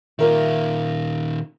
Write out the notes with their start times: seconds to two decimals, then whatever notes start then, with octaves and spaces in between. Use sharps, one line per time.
0.19 A#2 D#3 F4 A#4 E5